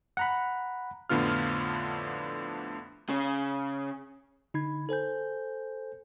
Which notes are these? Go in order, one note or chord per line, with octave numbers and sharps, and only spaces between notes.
F#5 A#5 B5
F2 A2 D3 B3 F4 F6
C#3
D3 D#4 B5 G#6
A4 C5 G#5 G6